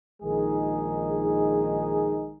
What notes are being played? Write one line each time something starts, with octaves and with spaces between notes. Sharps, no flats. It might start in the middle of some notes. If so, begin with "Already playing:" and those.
A#1 D#3 G#3 D#4 G#4